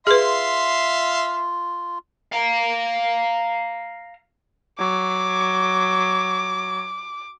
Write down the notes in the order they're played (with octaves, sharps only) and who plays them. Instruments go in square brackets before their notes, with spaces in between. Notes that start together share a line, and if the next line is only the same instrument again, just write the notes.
[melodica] F4 [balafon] G#4 B4 [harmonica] E5 F5 C6
[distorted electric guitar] F5 A#5
[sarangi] F#3 [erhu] D6